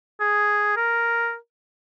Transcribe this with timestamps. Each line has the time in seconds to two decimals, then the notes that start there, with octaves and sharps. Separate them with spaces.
0.20 G#4
0.77 A#4